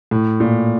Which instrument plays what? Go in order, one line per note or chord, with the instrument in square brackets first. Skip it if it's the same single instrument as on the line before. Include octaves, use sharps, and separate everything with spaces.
[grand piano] A2
A#2